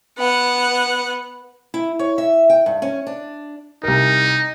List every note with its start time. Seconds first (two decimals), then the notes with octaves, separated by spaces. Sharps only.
0.18 B3 F#5
1.74 E4
1.99 C#5
2.18 E5
2.50 G5
2.66 G2
2.82 C#4
3.07 D4
3.83 C2 D#4 A#4